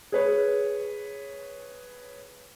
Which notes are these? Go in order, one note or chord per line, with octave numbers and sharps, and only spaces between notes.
G#4 B4 C#5